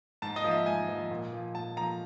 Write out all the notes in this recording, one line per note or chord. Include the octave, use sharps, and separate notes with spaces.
G#2 A5
D#5
F3
E5
G#2 G#5
F3
A#2
F3
A#2 A5
F3 A#5